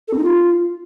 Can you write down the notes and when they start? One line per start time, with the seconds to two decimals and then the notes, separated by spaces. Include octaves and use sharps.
0.08 A4
0.13 C4
0.18 D#4
0.23 F4